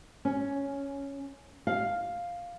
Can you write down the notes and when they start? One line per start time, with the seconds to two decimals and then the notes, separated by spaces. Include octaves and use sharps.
0.25 C#4
1.67 F5